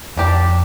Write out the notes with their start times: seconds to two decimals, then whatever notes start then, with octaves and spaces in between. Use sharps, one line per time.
0.17 F2 D4 G4 D5